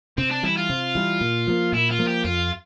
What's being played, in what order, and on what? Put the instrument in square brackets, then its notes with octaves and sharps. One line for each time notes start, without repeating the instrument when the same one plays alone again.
[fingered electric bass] C3 [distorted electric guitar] C4
[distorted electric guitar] D4
[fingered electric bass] E3 G3 [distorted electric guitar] E4
[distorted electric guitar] F4
[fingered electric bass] C3
E3 G3
A#2
F3 A#3
[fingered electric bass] A#2 [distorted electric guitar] E4
[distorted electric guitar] F4
[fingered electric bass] F3 A#3
[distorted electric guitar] G4
[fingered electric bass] F2 [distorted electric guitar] F4